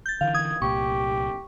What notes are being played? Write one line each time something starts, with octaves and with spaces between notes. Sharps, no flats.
G6 A6
D3 E3 F5
D#6 G#6
C2 A#2 G4 C#6